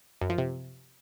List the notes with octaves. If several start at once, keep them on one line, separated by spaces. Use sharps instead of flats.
F#2
F3
C3